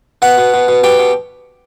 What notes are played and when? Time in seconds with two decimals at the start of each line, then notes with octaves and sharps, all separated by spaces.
0.22 B2 F#4 F#5
0.38 B2
0.54 B2
0.68 B2
0.83 B2 G4 G5
0.99 B2